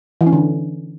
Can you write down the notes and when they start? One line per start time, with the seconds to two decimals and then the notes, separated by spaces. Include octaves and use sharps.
0.21 E3
0.27 C#4
0.33 D3